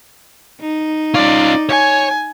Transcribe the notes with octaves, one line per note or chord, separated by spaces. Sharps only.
D#4
C#4 F4 D5
C#5 G#5